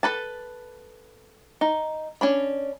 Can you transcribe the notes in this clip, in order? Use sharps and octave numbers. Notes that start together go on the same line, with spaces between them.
A4 B4 A5
D#4
C#4 D4 B5